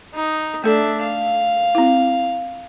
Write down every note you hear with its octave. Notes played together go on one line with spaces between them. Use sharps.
D#4
A3 D4 A4 E5
F5
C4 E4